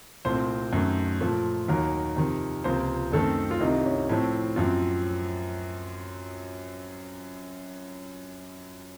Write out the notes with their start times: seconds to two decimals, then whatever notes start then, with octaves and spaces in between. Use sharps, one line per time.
0.25 C2 A#2 A3 C4 C5
0.73 F#2 D#3 A3
1.21 A#2 F3 A3
1.68 D#2 D#3 F#3 A#3 A#4
2.16 F2 C3 D#3
2.64 C#2 C3 F3 A#3 C5
3.12 F#2 D#3 A3 C4 A4
3.51 F4
3.60 C2 C3 D#3 D#4
3.85 C#4
4.09 A2 F3 A3 C4
4.56 F#2 F3 C4 F4